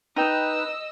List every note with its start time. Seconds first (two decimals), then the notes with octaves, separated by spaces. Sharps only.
0.16 D#4 B4 D#5 G5 E6